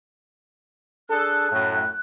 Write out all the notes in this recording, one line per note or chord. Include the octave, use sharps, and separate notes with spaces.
D4 G#4 A4 F#6
F#2 A2